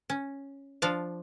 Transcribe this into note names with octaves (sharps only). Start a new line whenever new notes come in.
C#4
F3 D4 F4 F5